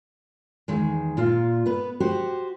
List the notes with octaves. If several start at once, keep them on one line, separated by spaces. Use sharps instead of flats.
E2 D#3 G#3
A#2 F4 F5
B3 B4
F#4 G4 C5